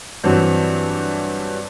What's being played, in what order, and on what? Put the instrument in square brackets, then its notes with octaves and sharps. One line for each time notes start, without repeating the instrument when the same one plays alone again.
[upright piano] G2 E3 F#3 C4